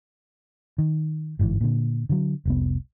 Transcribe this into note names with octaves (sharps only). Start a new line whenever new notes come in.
D#3
G1 G#2 B2 E3
A#2 D3
D3 F#3
F1 C2 B3